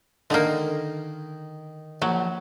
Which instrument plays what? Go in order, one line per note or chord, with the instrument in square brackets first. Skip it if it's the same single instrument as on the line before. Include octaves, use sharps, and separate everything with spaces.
[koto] D3 A#3 [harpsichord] D#3 D#4
[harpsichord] A#1 [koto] F#3